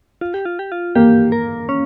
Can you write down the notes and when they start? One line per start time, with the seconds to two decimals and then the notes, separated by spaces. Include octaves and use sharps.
0.21 F4
0.34 G4
0.45 F4
0.59 G4
0.72 F4
0.95 A#3 G4
1.32 A#4
1.69 C#4